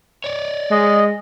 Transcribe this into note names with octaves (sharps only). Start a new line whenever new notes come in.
C#5 D5
G#3 D#5